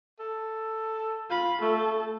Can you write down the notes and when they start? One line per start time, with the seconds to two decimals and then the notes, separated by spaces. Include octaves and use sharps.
0.19 A4
1.31 F4 B5
1.62 A3 A4